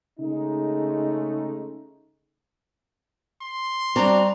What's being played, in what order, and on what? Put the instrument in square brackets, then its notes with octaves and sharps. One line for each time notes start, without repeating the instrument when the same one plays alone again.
[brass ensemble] C#3 G#3 A3 D#4
[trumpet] C6
[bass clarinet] G3 [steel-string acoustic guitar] C4 D4 F#4 [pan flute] A#5